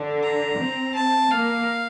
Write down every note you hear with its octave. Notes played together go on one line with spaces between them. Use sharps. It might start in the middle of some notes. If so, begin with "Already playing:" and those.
Already playing: D3
A#5
C4
A5
A#3 F5